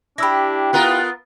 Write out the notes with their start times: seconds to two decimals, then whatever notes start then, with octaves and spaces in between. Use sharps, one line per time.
0.18 D4 E4 G4 B5 E6 A#6
0.73 B3 F4 A#4 F#5